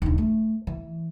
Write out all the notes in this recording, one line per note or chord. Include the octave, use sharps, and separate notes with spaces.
D#1 D3
A3
E3